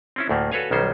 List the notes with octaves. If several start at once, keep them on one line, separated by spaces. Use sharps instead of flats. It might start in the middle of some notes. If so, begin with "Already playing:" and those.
C4 C#4 E4
D2 A2 A3 A#3
F#4 A4 B4 C#5 F5 G#5
B1 D#3 G3 C#4 C5